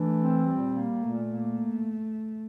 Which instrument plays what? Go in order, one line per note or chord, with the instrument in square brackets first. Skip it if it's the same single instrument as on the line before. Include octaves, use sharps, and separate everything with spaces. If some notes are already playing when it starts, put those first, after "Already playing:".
Already playing: [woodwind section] E3 D4 [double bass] A3
[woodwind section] C4
[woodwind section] A#2 [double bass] G3
[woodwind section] A#3
[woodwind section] A#2 [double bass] A3
[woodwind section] A#3